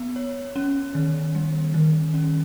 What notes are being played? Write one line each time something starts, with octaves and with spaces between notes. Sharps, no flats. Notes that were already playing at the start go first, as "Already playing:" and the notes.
Already playing: B3
C#5
C#4
D#3
G3
D#3
C#4